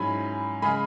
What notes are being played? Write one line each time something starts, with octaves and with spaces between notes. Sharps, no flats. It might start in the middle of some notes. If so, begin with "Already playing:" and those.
Already playing: G#2 F#3 C#4 E4 G#5 B5
C#3 G#3 G#5 B5